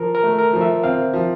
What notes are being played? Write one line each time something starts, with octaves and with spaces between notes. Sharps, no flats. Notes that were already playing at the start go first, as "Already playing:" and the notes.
Already playing: F3 A#4
A#4
A3
A#4
F3
E5
C4 F5
F3